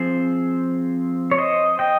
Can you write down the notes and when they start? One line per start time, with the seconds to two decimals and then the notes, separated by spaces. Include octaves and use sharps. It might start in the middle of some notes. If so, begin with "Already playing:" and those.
Already playing: F3 C4 G#4 C5
1.31 C#5
1.38 C5 D#5
1.79 D#5 G5